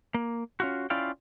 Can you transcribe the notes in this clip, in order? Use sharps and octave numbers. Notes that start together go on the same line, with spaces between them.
A#3
C#4 F4 F#4
C#4 E4 F4 D5 F5 G5